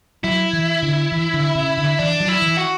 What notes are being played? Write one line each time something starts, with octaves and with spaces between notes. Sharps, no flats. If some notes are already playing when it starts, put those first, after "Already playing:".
F#3 E4
E3
D3
E3
D3
C#3
D3
E3 D4
F#3
E4
E3
F#4